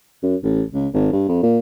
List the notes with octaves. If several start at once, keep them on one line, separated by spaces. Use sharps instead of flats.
F#2
A1
C#2
G#1
G2
F2
A#2